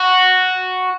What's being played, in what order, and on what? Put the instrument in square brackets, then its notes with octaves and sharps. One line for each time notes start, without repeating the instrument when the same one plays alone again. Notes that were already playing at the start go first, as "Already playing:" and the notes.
Already playing: [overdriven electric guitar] F#4